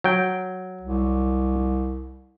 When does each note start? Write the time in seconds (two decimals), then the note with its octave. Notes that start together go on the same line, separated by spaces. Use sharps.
0.04 F#3 G5
0.81 C2